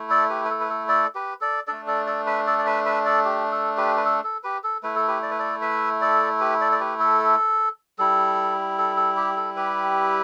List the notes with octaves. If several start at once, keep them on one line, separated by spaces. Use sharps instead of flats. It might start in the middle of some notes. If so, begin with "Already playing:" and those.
Already playing: A3 E4
A4 D5
G4 B4
B4
A4
B4
A4
A4 D5
G4 B4
A4 D5
A3 D4 A4 D5
A4 D5
A4 D5
B4 E5
A4 D5
D5
B4 E5
B4 E5
A4 D5
G4
A4
G4 B4
B4
A4
A4
G4 B4
A4
A3 E4 B4
A4
G4 B4
D5
B4
A4 D5
B4 E5
A4 D5
G4 B4
A4 D5
D5
G4 B4
A4
G3 E4 A4
A4
A4
G4
A4
G4 B4